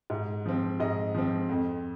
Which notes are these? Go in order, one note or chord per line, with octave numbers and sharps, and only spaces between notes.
G#2
F3 C4
G#2 D#5
F3 C4
F2